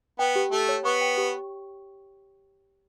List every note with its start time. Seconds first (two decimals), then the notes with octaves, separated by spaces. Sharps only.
0.19 B3 G5
0.36 G4
0.52 A3 G4
0.69 C#5
0.85 B3 C#6
1.01 G5
1.17 G4